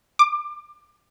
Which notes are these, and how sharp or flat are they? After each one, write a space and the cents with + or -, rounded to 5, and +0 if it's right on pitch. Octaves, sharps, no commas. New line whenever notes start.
D6 +25